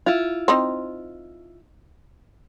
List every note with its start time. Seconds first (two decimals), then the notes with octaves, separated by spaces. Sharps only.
0.06 E4 F4
0.48 C4 D#4 C5